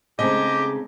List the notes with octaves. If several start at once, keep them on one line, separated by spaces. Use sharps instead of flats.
C#3 G#3 A3 C4 D#4 G4 D#5